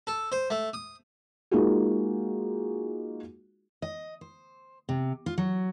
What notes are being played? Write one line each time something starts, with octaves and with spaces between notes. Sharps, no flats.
A4
C5
A3
D#6
G#3 A#3 D#4 F4 F#4 G#4
D#5
C5
C3
F4
F#3